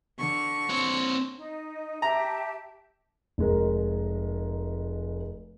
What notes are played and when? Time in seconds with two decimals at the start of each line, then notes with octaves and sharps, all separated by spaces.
0.18 D3 C#6
0.70 C4 C#5
1.37 D#4
2.02 G4 E5 A5 A#5
3.38 F1 G#3 A#4